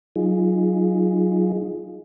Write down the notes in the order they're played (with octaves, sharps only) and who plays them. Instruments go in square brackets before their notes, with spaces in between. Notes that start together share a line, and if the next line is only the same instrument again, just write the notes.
[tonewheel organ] F#3 D#4 F4 G#4